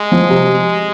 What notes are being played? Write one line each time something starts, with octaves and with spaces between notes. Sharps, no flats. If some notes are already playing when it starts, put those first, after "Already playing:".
Already playing: G#3
F3
C3